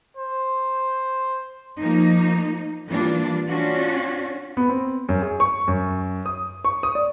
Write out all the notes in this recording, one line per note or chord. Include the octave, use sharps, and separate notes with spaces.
C5
F3 A#3 D#4
E3 G3 A#3 D4 F4
C#4 D4 F4 F#4
B3
C4
F#2
G#4
C#6
F#2
D#6
C#6
D#6
D5